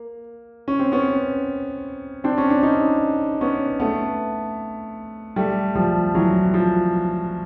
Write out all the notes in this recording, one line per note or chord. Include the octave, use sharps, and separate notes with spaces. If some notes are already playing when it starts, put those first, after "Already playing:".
Already playing: A#3
C#4
C4
B3 C#4
C4 D4
C#4
D4
C#4 D#4
B3 C#4
A3 B3
G3 A3
F3 G3
E3 F#3
F3